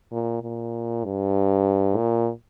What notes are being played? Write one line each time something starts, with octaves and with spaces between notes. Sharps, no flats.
A#2
A#2
G2
A#2